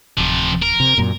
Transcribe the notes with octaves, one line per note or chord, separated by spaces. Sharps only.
D1 C3 F3
A#4
C3
F#2 A#2